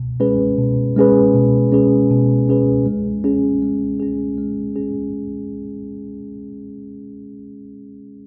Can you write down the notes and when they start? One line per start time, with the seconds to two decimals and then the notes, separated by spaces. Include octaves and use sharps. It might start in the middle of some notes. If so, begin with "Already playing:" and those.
Already playing: B2
0.20 G#3 C#4 G#4 B4
0.58 B2
0.96 G#3 C#4 G#4 B4
1.34 B2
1.72 G#3 C#4 G#4 B4
2.11 B2
2.48 G#3 C#4 G#4 B4
2.86 G#3
3.24 C#4 G#4
3.62 G#3
4.00 C#4 G#4
4.38 G#3
4.76 C#4 G#4